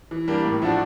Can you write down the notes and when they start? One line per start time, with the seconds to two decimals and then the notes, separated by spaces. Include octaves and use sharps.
0.11 E3
0.28 G3 A#3 D4
0.45 A2
0.62 F3 A3 D4 F#4